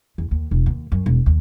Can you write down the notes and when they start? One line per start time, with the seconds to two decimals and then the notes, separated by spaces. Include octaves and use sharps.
0.18 E2
0.31 D#2
0.51 E1
0.66 D#2
0.92 F#2
1.06 E1
1.26 D#2